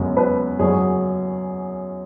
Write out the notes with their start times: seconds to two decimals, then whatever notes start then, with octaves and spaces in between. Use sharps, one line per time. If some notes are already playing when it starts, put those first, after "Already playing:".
Already playing: F#2 C#3 G#3 B3
0.17 B4
0.59 F#2 C#3 F#3 G#4